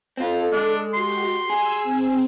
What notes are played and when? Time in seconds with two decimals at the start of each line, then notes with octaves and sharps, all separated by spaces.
0.17 C4 F4 A4
0.52 G#3 D4
0.93 F#4 G4 C6
1.50 G#4 G#5 E6
1.83 C4